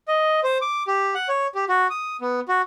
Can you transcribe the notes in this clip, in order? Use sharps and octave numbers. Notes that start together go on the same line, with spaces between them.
D#5
C5
D6
G4
F#5
C#5
G4
F#4
D#6
B3
F#4